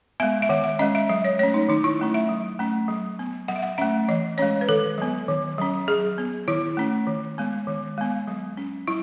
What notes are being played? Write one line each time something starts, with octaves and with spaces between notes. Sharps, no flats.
G#3 B3 E5
E5
D#3 F#5
E5
G#3 C#4 D#5
E5
F#3 E5
C#5
A3 C#4 C#5
D#4
D#3 D#4
E4
F#3 A3 C#4
E5
F#3
A3 C#4
F#3
B3
F#3 F#5
E5
F#5
A3 C#4 E5
E3 D#5
G#3 C#4 C#5
B4
D#3 A4
F#3 B3
D#3
F#3 C#4
F#3 G#4
B3
D#3 E4
A3 C#4
D#3
G#3 B3
D#3
G#3 B3
F#3
C#4
F#3 E4